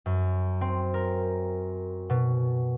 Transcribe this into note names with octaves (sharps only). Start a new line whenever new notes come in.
F#2
C4
A#4
B2